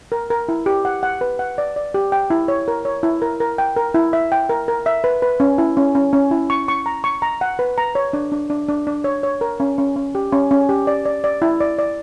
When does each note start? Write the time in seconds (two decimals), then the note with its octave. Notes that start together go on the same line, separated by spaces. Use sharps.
0.12 A#4
0.30 A#4
0.49 E4
0.66 G4
0.85 F#5
1.03 F#5
1.21 B4
1.39 F#5
1.58 D5
1.76 D5
1.94 G4
2.12 G5
2.30 E4
2.48 C#5
2.68 A#4
2.85 C#5
3.03 E4
3.22 A#4
3.40 A#4
3.58 G5
3.76 A#4
3.94 E4
4.13 E5
4.32 G5
4.49 A#4
4.68 A#4
4.86 E5
5.04 B4
5.22 B4
5.40 C#4
5.58 E4
5.77 C#4
5.95 C#4
6.13 C#4
6.31 E4
6.50 C#6
6.68 C#6
6.86 A#5
7.04 C#6
7.22 A#5
7.41 F#5
7.59 B4
7.78 A#5
7.95 C#5
8.13 D4
8.32 D4
8.50 D4
8.68 D4
8.87 D4
9.04 C#5
9.23 C#5
9.41 A#4
9.60 C#4
9.78 C#4
9.96 C#4
10.15 G4
10.32 C#4
10.51 C#4
10.69 G4
10.87 D5
11.05 D5
11.24 D5
11.42 E4
11.60 D5
11.79 D5